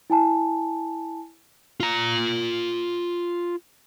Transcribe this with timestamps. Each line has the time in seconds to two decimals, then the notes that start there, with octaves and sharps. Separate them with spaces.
0.10 E4 G#5 A5
1.80 F4 A#5